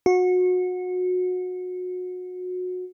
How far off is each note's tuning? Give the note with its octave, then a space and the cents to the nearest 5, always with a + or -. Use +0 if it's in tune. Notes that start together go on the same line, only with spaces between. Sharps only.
F#4 -25